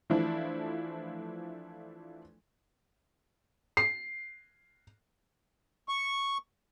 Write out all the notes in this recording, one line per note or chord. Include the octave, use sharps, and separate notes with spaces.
E3 F3 A3 D4 E4
C7
C#6